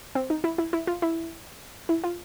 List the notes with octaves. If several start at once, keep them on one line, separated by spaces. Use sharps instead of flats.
C4
D#4
E4
E4
E4
F4
E4
E4
F4